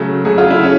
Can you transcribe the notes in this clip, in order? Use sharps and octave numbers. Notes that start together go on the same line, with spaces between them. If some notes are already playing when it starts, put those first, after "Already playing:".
Already playing: C#3 F#3 A3
C#3 F#3 A3 G#4
F4
E4
C#4